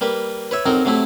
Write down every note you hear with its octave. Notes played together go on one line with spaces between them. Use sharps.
G3 A#3 B4
B4 C#5 E5
F2 F#3 C4 D#4 A#4
C3 F#3 A3 E4